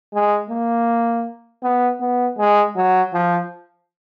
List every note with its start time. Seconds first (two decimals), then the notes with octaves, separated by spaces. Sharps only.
0.13 G#3
0.50 A#3
1.63 B3
2.01 B3
2.38 G#3
2.76 F#3
3.13 F3